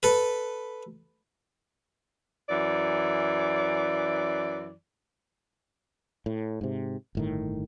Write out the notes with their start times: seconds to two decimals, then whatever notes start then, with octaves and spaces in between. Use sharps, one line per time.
0.03 A4 B4
2.49 F#2 E3 D5
6.26 A2
6.61 G#2 C3
7.15 G1 A2 D#3